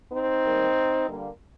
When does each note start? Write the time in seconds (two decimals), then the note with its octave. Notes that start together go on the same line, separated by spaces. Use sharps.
0.12 C4 D#4
0.44 D#3 G3 A#3
1.06 D3 G3 A#3